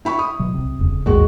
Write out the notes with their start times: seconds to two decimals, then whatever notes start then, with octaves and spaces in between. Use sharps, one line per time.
0.05 E4 B5 C#6
0.19 D#6
0.39 B2 F#3
0.54 C2 C3
0.79 E1 F2 C#3
1.06 A1 D#2 G#2 G#3 F#4